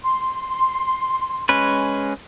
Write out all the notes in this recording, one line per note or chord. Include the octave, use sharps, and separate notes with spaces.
C6
G#3 C#4 B4